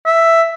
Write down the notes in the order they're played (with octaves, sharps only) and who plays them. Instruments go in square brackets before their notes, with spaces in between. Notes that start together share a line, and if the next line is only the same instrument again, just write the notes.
[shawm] E5